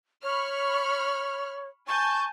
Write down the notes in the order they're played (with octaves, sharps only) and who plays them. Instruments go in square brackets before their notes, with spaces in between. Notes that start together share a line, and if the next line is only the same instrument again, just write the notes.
[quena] C#5 [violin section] B5 C#6 F6
[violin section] G#5 A5 G6 [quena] C#6